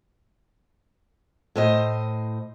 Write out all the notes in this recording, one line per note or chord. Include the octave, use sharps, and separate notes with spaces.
A2 C5 D#5